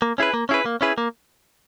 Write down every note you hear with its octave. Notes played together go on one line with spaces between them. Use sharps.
A#3
C#4 E4 G#4 B4
A#3
C#4 E4 G#4 B4
A#3
C#4 E4 G#4 B4
A#3